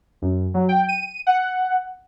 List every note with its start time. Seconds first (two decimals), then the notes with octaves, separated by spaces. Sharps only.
0.22 F#2
0.54 F#3
0.69 G5
0.89 D#7
1.27 F#5